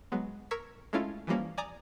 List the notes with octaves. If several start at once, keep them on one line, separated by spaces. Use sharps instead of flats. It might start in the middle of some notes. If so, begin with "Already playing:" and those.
F#3 G#3 B3
A#4 C#6 E6 G#6 B6
G#3 A3 C#4 E4 F4
E3 F3 G3 A#3 C#4
D5 G#5 A#5 D6 D#6